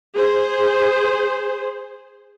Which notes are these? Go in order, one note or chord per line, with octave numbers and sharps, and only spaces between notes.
G#4 C5